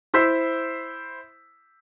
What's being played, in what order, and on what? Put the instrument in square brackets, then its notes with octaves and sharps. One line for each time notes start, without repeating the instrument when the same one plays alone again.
[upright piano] E4 C5 E6 B6